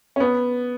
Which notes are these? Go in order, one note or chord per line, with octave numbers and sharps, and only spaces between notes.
C#4
B3